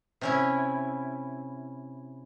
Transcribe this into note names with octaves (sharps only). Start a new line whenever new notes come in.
C3 C#4 E4